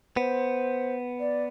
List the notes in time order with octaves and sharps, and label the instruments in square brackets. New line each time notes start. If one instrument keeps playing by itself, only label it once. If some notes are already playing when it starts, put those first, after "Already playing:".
[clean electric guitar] B3 [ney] C5
[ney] D5